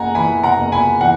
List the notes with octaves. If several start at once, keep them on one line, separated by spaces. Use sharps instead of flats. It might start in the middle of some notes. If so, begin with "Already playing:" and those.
Already playing: F#1 F#5 G#5 A#5
E3 G#5 B5
F#5 A#5
F#1
G#5 B5
E3 F#5